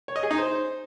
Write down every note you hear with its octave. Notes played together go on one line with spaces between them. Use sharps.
C#5
D#5
G#4
D#4
C5